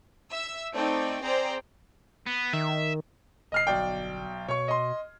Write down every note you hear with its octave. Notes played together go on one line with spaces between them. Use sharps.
E5 E6
A3 C4 D#4 D5 G5
C4 G#4 C5 D5 G5 A#5
B3
D#3 E5
G1 D#5 F6 C7
B1 D5 G5
B2 C#5 C#6
D#5 C6